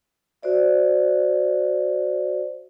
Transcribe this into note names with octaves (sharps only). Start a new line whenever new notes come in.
F#4 C5 D5 E5